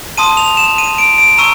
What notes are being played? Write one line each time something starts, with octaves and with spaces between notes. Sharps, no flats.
A5 C6 D#6 D#7
F7
E7
D#7
D7
D7
A#5 C#6 E6 D#7